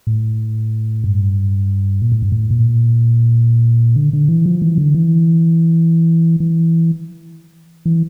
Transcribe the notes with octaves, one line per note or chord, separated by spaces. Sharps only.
A2
G2
A#2
A2
G2
A2
A#2
D3
D3
E3
F3
E3
D3
E3
E3
E3